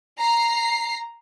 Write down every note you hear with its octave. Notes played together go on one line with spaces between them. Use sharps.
A#5 C7